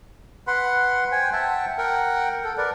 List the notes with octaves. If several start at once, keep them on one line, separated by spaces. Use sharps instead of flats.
B4 F#5 B5 C6
C5 G5 G#5
E5 F#5 G5 A5
A#4 F#5 G5
A4
A#4 B4 D5